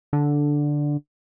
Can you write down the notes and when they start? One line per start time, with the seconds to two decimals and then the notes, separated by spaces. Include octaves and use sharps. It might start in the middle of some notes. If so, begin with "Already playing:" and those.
0.13 D3